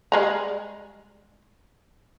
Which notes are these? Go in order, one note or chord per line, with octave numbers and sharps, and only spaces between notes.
G3 G#3 A#5